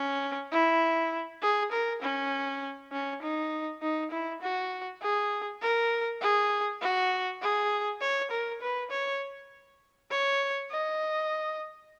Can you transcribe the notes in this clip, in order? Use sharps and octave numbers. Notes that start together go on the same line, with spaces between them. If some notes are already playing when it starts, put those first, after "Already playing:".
Already playing: C#4
E4
G#4
A#4
C#4
C#4
D#4
D#4
E4
F#4
G#4
A#4
G#4
F#4
G#4
C#5
A#4
B4
C#5
C#5
D#5